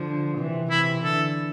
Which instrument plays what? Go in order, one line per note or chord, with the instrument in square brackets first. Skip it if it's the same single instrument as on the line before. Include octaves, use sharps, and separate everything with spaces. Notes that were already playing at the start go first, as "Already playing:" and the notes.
Already playing: [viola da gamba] D3 F3
C3 E3
[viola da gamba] C3 E3 [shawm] E4
[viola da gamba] D3 [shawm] A4